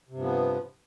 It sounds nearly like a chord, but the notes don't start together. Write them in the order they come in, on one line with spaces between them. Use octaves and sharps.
C3 G2 F3 B3